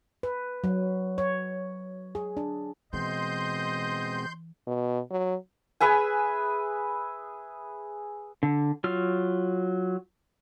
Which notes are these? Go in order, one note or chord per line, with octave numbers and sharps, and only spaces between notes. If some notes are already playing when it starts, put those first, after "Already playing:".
B4
F#3
C#5
G#4
D4
B2 E3 G#3 C4 D#5 C6 G6
B2
F#3
G#4 B4 E5 G#5
D3
F#3 F4 F6